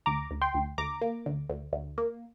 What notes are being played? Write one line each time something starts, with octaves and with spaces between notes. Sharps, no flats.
D2 A#5 D6
D2
G5 C6
D2
D2 A#5 D6
A#3
D2
D2
D2
A#3